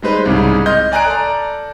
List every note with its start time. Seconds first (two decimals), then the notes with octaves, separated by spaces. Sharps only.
0.02 G3 G#3 D#4 B4 C5
0.25 C2 G#2 C#3
0.66 D#5 C6 F6 G6
0.92 D5 G#5 A#5 F#6 D7
1.06 A4 D5 A#5